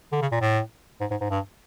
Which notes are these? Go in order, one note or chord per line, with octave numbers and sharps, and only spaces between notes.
D3
C#3
A#2
A2
G#2
G#2
G#2
G2